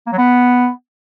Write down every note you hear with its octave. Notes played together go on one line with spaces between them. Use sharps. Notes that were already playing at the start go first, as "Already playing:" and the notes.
A#3
F#3
B3